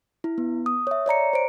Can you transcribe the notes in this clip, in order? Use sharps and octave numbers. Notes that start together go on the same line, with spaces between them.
E4
B3
D#6
C#5 E5
C#5 D5 A#5 C#7
C5 D7